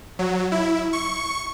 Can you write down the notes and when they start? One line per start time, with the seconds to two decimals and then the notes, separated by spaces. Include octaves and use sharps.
0.19 F#3
0.52 E4
0.93 C#6